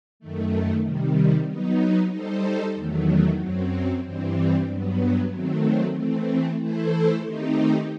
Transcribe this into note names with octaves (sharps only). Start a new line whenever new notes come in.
F#2 D#3 A3
C3 D#3 G3
F#3 B3 D#4
G3 D#4 A4 C5
E2 D#3 F#3 A3
F#2 F#3 C4
G2 E3 G3 C4
G2 F#3 B3
D#3 F#3 A3 C4
E3 A3 C4
E3 A3 E4 A4 C5
D#3 A3 C4 D#4 G4